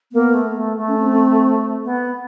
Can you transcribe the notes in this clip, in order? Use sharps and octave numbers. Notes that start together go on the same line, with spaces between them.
A#3 B3
A3
A3
A3
C#4
C4
B3